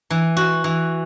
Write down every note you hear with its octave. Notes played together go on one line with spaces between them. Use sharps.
E3
F#4
E3